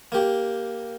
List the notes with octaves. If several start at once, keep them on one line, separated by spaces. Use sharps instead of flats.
A#3 G4